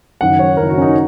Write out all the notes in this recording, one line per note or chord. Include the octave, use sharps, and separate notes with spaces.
F#1 F#2 D#3 F#5
C#5
F#1 F#2 D#3 A#4
F#4
C#4
D#4